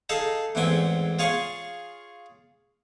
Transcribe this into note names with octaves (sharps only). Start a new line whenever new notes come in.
D#4 G#4 A4 F5
A1 E2 G#2 C4 G5 G#5
F4 G#4 C#5 F5 G#5 C#6